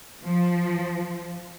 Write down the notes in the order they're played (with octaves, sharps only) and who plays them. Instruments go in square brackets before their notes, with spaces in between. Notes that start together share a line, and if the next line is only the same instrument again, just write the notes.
[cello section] F3